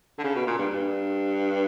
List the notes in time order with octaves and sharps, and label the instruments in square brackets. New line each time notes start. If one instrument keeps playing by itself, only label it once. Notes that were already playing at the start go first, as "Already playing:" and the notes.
[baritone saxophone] D3
C#3
B2
A#2
G2
G2